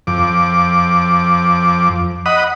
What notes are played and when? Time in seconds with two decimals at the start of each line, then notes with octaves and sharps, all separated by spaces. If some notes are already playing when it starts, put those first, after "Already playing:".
0.07 F2 D6
2.26 D#5 F#5 B5 D#6